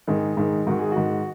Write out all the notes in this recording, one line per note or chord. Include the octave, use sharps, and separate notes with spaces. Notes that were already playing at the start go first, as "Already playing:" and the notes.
G#2 D#3 G#4
G#2 D#3
G#2 D#3 F#4
G#4
G#2 D#3 F#4